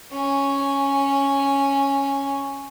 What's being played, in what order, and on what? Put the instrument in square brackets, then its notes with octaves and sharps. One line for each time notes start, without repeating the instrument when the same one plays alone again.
[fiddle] C#4 G#5